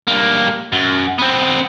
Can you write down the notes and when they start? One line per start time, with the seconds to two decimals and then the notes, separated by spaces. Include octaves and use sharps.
0.08 G2 A#3
0.73 F#2
1.18 B3 C4